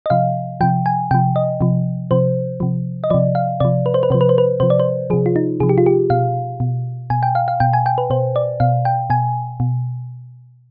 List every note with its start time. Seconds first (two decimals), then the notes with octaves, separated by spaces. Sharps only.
0.06 D#5
0.10 C3 F3 F5
0.61 C3 F3 G5
0.86 G#5
1.11 C3 F3 G5
1.36 D#5
1.61 C3 F3
2.11 C3 F3 C5
2.60 C3 F3
3.04 D#5
3.10 C3 F3 D5
3.35 F5
3.60 C3 F3 D5
3.86 B4
3.94 C5
4.03 B4
4.10 C3 F3 C5
4.21 B4
4.29 C5
4.38 B4
4.60 C3 F3 C5
4.70 D5
4.80 C5
5.10 F3 G#4
5.13 C3
5.26 F4
5.36 D#4
5.60 C3 F3 G#4
5.69 G4
5.78 F4
5.86 G4
6.10 B2 F5
6.60 B2
7.10 B2 G#5
7.23 G5
7.35 F5
7.48 F5
7.60 B2 G5
7.73 G#5
7.86 G5
7.98 B4
8.10 B2 C5
8.36 D5
8.60 B2 F5
8.85 G5
9.10 B2 G#5
9.60 B2